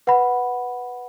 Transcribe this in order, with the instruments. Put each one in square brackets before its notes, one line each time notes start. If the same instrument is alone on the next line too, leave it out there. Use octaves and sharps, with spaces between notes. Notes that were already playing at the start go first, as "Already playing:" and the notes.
[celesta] B4 F#5 B5